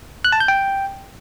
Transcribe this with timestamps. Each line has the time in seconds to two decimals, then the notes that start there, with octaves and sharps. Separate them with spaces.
0.25 F#6
0.32 A5
0.40 G6
0.48 G5